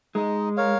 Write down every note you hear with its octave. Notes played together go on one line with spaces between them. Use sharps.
G#3 D#4
A#4 C#5 F5